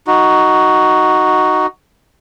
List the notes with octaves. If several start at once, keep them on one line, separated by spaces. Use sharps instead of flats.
D#4 F#4